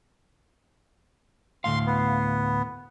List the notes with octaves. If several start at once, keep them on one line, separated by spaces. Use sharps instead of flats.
D2 A2 F5 C6
B3